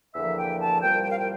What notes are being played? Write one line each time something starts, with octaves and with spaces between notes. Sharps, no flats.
E2 D3 F3 A#3 E5
G5
A5
C2 A#2 G3 G5
G5
F5
G5